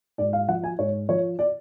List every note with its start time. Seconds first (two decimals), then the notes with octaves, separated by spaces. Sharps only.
0.18 G#2 D5
0.33 F5
0.48 F3 F#5
0.64 G#5
0.79 G#2 C#5
1.09 F3 C#5
1.39 D5